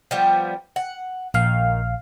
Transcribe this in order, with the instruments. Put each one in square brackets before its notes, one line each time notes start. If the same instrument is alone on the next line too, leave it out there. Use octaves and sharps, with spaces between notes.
[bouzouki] F3 G3 B3
F#5
[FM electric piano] A#1 F5 [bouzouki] D#3